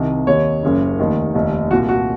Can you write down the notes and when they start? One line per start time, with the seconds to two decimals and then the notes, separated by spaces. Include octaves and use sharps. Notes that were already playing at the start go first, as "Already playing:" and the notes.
Already playing: C2 C3 D#3
0.27 D#2 D#3 C#5
0.63 F#1 F#2 C#3
0.99 F1 D#2 D#3
1.34 F1 D#2 D#3
1.71 C2 A#2 F#4
1.89 F#4